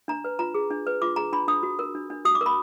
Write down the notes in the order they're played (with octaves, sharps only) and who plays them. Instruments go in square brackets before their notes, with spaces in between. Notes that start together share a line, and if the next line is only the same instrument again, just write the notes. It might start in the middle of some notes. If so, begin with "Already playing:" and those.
[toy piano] D4 A#5
B4
F4 A#5
G#4
D4
B4
F4 D6
G#4 A#5
D4 B5
D4 D#6
F#4
A#4
D4
D4
F#4 D#6
D6
A#4
B5